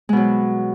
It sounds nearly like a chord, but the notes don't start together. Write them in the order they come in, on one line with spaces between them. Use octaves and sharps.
G#3 B2 F#3